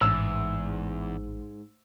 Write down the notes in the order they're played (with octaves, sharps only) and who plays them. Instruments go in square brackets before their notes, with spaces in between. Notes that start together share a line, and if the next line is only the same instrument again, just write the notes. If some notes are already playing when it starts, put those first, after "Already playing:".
[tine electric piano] A1 [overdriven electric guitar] E2 [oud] G#2 [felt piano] E6